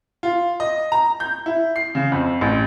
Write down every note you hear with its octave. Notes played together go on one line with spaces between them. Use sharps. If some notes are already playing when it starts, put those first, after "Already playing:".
F4
D#5
A#5
G6
E4
C7
C#3
F2
A1